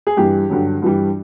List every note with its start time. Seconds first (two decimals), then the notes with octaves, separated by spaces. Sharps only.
0.07 G#4
0.17 G2 E3 G3 G4
0.49 G2 D3 F#3
0.82 G2 E3 G3